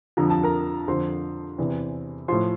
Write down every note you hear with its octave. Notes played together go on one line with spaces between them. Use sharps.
F2 D3 F3 A#5
A5
A#4 A#5
F2 D3 F3 C5 C6
E2 C3 E3
A2 F3 C5 C6